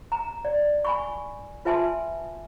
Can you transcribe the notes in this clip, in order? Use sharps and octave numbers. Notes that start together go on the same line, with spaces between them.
A#5
D5
G#5 B5 C#6
F4 B4 E5 G#5 A5 C6